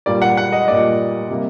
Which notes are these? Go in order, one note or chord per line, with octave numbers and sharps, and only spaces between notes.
A#2 G3 A#3 D5
F#5
F#5
D#5
A#2 G3 A#3 D5
C3 G3 A#3